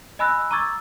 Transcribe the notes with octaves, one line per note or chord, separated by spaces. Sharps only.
D#5 G#5 B5 E6 F#6 A#6
A#5 C#6 D6 E6 G#6 A6